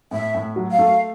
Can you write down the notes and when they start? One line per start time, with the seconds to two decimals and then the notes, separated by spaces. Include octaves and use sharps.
0.11 A2 E5
0.34 A2
0.56 F#3
0.71 F5
0.79 A3